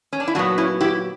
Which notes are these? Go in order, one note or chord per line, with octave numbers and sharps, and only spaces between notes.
C#4
D4
E4
A#2 F#3 B3 D4 F#4
C#4 E4
E4 G4